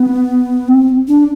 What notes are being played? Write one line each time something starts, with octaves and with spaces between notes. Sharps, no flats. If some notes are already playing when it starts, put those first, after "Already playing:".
Already playing: B3
C4
D4